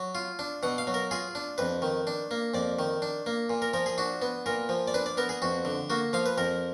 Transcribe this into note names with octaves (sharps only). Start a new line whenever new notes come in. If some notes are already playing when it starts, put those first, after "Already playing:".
Already playing: F#3
F4
D4
B2 F#5
F5
F#3
A#4
F4 G#4
D4
F2 B4
D#3
D4
A#3
F2 D5
D#3
D4
A#3
A#2
A#4
F3 A#4
G#4
D4 F#4
B3
A#2 A#4
F3
D5
D4 B4
D5
B3 A#4
G#4
F2 F#4
D3
A#3 F#4
F3 F5
B4
F2 A#4